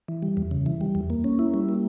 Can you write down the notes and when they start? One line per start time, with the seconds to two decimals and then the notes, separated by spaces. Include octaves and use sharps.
0.08 E3
0.22 G3
0.37 E2
0.51 C#3
0.66 E3
0.81 G3
0.95 E2
1.10 A#3
1.24 C#4
1.39 E4
1.54 G3
1.69 A#3